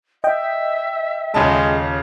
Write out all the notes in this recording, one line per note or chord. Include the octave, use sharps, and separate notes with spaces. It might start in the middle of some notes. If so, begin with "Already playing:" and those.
D#5 E5 G5
D#1 C#3 G#3 A5